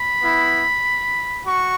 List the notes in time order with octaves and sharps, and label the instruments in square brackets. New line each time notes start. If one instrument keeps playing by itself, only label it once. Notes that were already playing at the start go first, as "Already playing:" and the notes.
Already playing: [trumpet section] B5
B3 E4
F#4 C#6